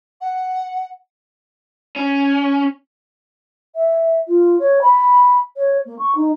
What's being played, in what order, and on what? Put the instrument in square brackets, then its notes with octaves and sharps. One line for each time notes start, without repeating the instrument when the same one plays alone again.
[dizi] F#5
[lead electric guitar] C#4
[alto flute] E5
F4
C#5
B5
C#5
A#3
C#6
D#4